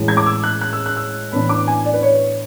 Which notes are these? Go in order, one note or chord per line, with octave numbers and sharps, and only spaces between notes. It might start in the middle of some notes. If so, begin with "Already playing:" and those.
Already playing: A2 E3 G#3
G#6
D6
E6
F#6
F#6
E6
F#6
E6
A2 E3 B3 D4 B5
D6
G#5
D5
B4
C#5